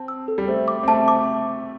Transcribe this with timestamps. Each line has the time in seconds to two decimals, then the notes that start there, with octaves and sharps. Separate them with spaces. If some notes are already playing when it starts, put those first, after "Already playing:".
Already playing: C4 A5
0.08 E6
0.28 A4
0.38 G3
0.48 A3 C5
0.68 D6
0.83 C4
0.88 A3 A5
1.08 D6